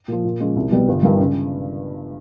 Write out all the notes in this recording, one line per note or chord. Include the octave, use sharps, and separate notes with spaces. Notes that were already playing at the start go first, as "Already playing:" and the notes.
A#2 F3
A#2
F3 G#3 C#4
C2
B2 G3 B3
G1
G2 D#3 G3
C#3